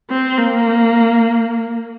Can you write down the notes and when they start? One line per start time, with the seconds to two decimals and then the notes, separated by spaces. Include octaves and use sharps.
0.10 C4
0.38 A#3